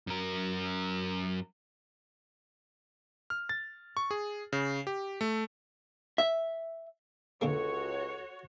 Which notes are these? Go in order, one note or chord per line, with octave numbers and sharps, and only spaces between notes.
F#2 A#4
F6
A6
C#6
G#4
C#3
G4
A3
E5
C#2 D3 G#3 A#3 F#4 A4 C#5